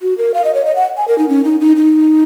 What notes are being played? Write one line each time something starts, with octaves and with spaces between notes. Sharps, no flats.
F#4
A#4
F5
D#5
C#5
D#5
F#5
G#5
A#4
D#4
C#4
D#4
D#4
D#4